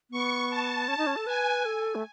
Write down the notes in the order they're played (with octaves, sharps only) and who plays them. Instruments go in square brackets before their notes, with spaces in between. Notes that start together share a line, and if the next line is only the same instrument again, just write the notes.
[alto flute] B3 [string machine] C#6
[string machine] A5
[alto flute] C#4
D#4
C#4
A4
[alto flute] B4 [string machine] G#5
[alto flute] A4
A3